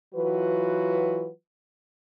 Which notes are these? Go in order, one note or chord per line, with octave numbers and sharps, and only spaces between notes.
E3 F#3 F4 F#4 B4